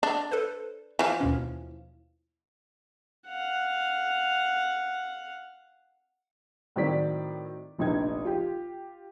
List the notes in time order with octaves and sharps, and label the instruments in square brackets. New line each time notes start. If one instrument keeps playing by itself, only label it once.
[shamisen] D4
[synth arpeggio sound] A4 B4 C5
[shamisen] E3 F3
[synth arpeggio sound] D#2 B2 C#4
[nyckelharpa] F5 F#5
[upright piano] A2 D#3 F#3 C4 D5 B6
F1 A#1 D4 D#4 G#6
F4 G4